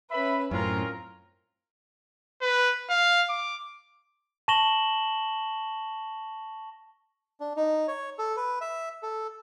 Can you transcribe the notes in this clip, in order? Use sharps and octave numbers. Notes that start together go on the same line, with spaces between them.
C#4 B4 E5 B5
F#2 A2 C4 C#4 F4 A#4
B4
F5
D6
A5 C#6 A#6 E7 F#7 G7
D4
D#4
C#5
A4
B4
E5
A4